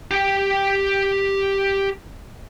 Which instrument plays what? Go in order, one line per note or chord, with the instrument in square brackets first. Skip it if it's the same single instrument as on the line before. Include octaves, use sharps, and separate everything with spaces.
[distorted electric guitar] G4 G5